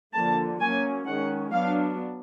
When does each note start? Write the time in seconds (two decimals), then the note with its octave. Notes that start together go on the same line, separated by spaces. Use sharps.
0.14 D3 F3 A#3 A5
0.60 F#3 A#3 C#4 G#5
1.06 D#3 G#3 C#4 F#5
1.52 F#3 B3 D4 F5